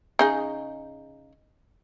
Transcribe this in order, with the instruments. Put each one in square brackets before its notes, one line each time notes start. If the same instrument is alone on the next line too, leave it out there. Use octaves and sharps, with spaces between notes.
[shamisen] C#3 D#4 G#4